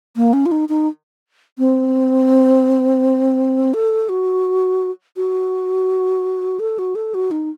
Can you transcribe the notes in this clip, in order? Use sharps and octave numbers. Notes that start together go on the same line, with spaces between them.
A#3
C#4
F4
D#4
D#4
C4
A4
F#4
F#4
A4
F#4
A4
F#4
D#4